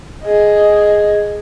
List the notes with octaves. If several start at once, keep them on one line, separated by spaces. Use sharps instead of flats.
G#4 D#5